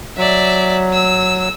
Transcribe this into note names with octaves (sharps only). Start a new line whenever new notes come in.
F#3 D5 E5
E6